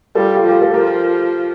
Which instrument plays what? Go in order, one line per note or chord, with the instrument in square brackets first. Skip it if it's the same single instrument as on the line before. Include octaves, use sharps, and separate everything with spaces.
[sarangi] G3 [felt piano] F4 A4
[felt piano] F4
[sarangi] F3 [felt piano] G4
[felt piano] A4
[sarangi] F3 [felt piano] G4 A#4